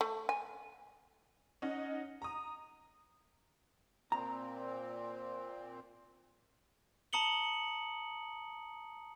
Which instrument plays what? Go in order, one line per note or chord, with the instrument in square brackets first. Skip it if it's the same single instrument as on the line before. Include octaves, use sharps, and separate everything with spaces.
[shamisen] A3
G#5
[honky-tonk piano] C#4 D#4 D#5 F#5
A#5 D#6
[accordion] A#2 C4 [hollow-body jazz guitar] A#5
[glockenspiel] A5 A#5 D#6 C#7 F#7 G7